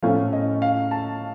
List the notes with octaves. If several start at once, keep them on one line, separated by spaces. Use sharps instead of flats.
A2 F3 A3 C#4 F5
D#5
F5
A5